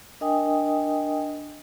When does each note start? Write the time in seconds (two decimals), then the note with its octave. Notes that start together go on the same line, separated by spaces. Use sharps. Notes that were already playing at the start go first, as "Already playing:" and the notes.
0.21 D4 A#4 D#5 G5 G#5 D#6